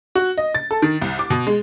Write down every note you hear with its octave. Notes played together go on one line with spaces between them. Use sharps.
F#4
D#5
A6
A4
D#3
C2
D6
B2
G#3